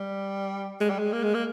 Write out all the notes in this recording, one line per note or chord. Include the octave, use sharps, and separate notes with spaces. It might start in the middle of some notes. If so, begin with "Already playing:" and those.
Already playing: G3
G#3
G3
G#3
A#3
G#3
A#3